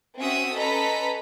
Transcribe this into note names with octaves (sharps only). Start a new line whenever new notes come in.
C4 C#4 F#4 E5 D#6 E6
C#4 A4 B4 D#5 A#5 B6